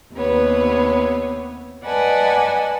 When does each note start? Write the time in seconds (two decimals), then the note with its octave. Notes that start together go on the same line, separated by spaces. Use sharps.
0.13 D#2 C3 B3 C#5
1.85 B4 D5 D#5 F#5 G#5 A5